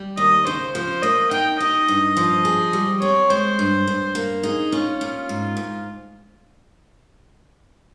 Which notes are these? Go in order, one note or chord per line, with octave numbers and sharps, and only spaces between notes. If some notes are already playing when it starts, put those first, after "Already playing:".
Already playing: G3
D#2 D#5
C#3 C5
F3 C5
A#3 D#5
D#4 G5
D#4 D#5
G2
F3
G#4
G3
C4 C#5
G#3 C5
G2
G2
A#3
D#4 G#4
C#4 F4
A#2
G#2
G#2